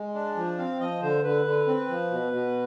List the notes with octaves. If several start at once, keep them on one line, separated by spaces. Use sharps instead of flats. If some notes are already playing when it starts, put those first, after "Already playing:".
Already playing: G#3
D4
F3
C4 F5
F3 D#5
D3 C5
D3 B4
D3
C4
F3
B2
B2